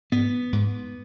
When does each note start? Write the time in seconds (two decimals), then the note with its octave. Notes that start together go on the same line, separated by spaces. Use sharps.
0.12 G#2 B3
0.53 G#2